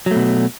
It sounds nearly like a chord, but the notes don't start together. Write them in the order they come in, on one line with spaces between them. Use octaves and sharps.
F#3 A3 B2